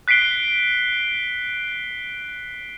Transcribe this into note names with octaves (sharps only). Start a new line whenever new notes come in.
F#6 B6 C7 D7 G7